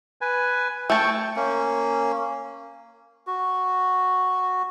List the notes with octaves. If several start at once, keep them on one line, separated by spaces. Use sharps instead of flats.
B4 G#5
A3 G5 A5 C#6
A#3 C#4
F#4